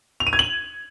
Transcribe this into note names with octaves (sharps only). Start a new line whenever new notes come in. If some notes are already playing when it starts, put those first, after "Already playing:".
F7
D#7
G#6
F#7